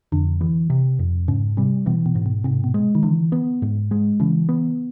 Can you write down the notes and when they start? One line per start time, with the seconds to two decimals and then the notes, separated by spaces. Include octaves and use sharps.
0.12 F2 D3
0.41 E3
0.70 C3
0.99 F2
1.28 G#2 C#3
1.57 C3 G3
1.86 B2 E3
2.06 B2
2.15 G#2
2.26 B2
2.44 G#2 C3
2.64 B2
2.74 G#3
2.95 D#3
3.03 D3 E3
3.32 B3
3.62 G#2
3.91 G#3
4.20 C#3 E3
4.49 B3